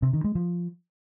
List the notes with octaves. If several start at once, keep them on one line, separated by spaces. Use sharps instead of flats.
C3
D#3
G#3
F3